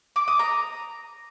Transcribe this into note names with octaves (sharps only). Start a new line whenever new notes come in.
D6
D#6
A#5